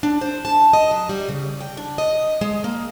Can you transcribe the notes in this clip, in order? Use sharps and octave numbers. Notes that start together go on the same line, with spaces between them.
D4
C5
A5
D#5
F#3
G3
C#3
G5
D4
D#5
G#3
A#3